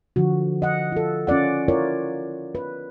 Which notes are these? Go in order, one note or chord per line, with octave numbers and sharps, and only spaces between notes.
D3 F3 F#4
D#5 F#5
F4 A4
C#4 F4 D5 F#5
E4 F4 A#4 C#5 D5
B4